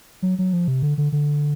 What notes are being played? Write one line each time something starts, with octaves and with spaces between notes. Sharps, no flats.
F#3
F#3
F3
C3
D3
D3
D3